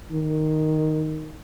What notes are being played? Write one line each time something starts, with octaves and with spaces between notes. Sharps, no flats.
D#3